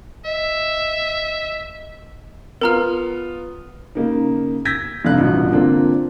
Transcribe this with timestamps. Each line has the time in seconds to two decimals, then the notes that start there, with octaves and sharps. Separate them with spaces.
0.25 D#5 E5
2.61 B3 F4 A#4 A#5 F6
3.95 C#3 A#3 D#4
4.65 E6 G6 G#6 A#6 B6
5.05 F1 G2 C3 D4 F5 F#6
5.18 A1 G2 B2 F4
5.52 D3 A#3 C4 D4 F4